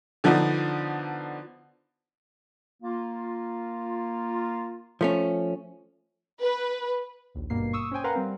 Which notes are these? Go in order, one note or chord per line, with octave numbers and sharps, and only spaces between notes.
D3 F3 B3 D4 D#4
A#3 F4
F3 A3 C#4
B4
A#1 D#2
G#1 G2 B2 A#3 C7
C#6 D#6 E6
C#4 C5 G5 G#5
A#4 B4 F5 F#5 A#5 C6
G3 C4